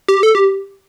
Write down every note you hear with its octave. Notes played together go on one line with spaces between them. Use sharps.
G4
A4
G4